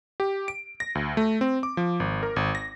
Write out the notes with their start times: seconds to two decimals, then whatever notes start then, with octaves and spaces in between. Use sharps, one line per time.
0.20 G4
0.48 D7
0.80 A#6
0.95 D2
1.17 A3
1.41 C4
1.63 D6
1.77 F3
2.00 G#1
2.23 A#4
2.36 G#1
2.55 A#6